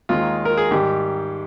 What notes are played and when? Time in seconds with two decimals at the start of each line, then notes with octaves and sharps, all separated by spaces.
0.09 D#2 D#3 G#3 F4
0.45 A#4
0.57 G#4
0.71 G#1 G#2 D#3 G3 G4